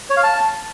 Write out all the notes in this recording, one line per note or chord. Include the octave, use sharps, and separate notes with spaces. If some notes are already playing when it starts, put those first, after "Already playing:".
C#5
F5
A5